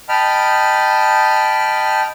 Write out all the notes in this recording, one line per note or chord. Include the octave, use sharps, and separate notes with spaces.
D#5 G5 A5 B5 F6